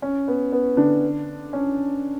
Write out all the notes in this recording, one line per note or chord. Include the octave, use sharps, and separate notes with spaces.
C#4
B3
B3
D3 D4
C#4